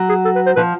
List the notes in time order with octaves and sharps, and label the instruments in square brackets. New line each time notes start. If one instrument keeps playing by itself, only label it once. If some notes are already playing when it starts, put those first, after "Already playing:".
Already playing: [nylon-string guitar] F#3
[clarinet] G#4
A4
B4
C5
[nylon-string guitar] F3 [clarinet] B4